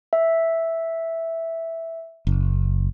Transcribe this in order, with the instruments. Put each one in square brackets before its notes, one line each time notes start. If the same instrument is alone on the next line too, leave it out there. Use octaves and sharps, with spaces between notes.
[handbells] E5
[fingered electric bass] F#1